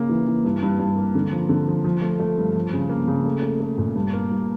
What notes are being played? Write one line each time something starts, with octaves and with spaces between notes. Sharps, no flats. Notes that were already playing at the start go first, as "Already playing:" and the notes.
Already playing: C#3 A#3
E3
E3
G2
G2
G2
A#3
D3
F3
D3
F3
F3
A3
A3
G2
F3
C#3
A#3
C#3
A3
A3
A3
A#2
G2
A#3
G2